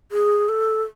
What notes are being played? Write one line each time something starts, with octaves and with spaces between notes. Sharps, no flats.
G#4
A4